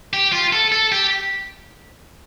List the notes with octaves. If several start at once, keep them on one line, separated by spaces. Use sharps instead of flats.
G4
F4
A4
A4
G4